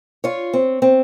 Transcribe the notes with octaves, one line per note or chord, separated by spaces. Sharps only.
F4 C#5
C4
C4